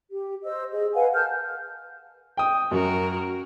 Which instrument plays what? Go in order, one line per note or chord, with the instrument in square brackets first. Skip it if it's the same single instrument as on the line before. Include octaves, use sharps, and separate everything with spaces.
[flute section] G4
C5 D#5 E6
G#4 C5 D#5
B4 F5 F#5 G#5
A#4 A5 F6 G6
[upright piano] G5 D#6
[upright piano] F#2 [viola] F#4 A#4